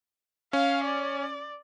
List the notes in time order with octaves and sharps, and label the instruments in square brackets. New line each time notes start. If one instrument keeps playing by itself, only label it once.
[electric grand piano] C#4 [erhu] F5
[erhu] D5